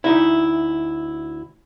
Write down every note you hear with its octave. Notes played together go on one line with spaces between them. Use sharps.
D2 D#4 E4